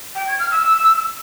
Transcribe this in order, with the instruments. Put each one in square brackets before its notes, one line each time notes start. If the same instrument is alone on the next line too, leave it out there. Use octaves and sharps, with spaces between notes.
[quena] G5
G#6
F6
E6